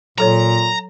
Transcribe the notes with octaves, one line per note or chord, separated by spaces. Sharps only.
A#2 F#3 A4 C#5 A#5